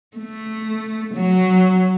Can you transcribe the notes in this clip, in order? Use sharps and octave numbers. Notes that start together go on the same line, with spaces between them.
A3
F#3